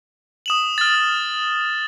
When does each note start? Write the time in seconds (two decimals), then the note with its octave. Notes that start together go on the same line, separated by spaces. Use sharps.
0.46 D#6 E7 F#7
0.78 F6 A6